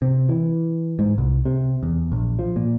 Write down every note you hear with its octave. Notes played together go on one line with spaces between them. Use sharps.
C3
E3
G#2
C2
C3
E2
A#1
F3
A#2